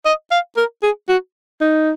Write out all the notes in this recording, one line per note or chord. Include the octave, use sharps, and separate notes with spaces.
D#5
F5
A#4
G#4
F#4
D#4